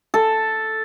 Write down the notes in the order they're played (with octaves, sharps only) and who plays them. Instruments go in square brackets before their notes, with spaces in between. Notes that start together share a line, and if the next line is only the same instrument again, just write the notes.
[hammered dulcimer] A4